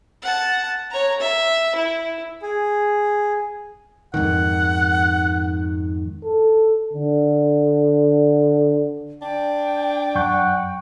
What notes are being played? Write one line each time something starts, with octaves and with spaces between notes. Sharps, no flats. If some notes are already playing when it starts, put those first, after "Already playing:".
F#5 A5
C#5 A#5
E5
E4
G#4
F2 G#2 D#3 F#5
A4
D3
D4 G5
F#2 F#5 C#6 G6